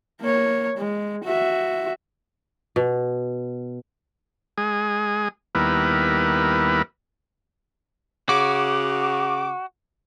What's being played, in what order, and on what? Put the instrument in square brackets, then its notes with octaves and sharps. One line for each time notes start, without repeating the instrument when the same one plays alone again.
[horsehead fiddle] A#3 C#5
G#3
F#4 E5
[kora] B2
[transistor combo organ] G#3 G#4
D#2 G3 B3 E4 A#4 B4
[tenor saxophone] C#3 [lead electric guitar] F#4 [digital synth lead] D6